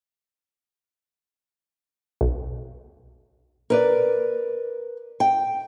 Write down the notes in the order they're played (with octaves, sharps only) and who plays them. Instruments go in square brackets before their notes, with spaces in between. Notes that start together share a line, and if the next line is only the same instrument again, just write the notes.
[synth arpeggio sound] B1
[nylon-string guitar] A#4 B4 D5
G5